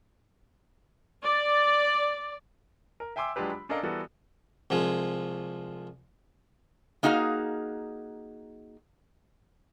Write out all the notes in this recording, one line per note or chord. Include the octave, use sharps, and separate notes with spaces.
D5
A#4
E5 G5 G#5 C6 D6 E6
F#3 G#3 D4 F4 G4 B4
B5
C#4 D4 A4 A#4 D#5 F5
E3 G3 B3 F#4 A4 A#4
C2 F3 G#3
A#3 D#4 F#4 G#4 F5